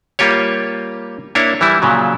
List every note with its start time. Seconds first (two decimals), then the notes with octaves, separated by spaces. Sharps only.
0.19 G3 A#3 F4 G4 C#5
1.35 A#3 D4 E4 C#5
1.61 E3 G3 E4
1.82 A#2 C#3 F#3